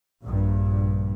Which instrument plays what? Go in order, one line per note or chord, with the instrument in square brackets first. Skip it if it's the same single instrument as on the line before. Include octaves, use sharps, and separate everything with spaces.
[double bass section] A#1 G2